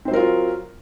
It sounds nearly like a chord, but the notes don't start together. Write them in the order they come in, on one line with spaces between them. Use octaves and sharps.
C4 C5 F#3 A#4 F4